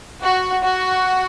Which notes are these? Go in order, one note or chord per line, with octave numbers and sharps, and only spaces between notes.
F#4
F#4